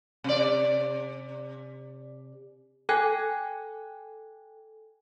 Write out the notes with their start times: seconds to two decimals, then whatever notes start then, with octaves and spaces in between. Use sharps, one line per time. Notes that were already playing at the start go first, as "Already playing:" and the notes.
0.24 C3 D5
2.89 A4 G5 G#5 F#6 G#6